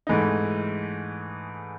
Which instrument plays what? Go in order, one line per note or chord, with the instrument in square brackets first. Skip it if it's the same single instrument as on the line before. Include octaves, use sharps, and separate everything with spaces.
[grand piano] G#2 E3 A3 D#4